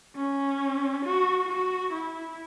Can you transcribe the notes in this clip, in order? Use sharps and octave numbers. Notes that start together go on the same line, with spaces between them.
C#4
F#4
F#4
E4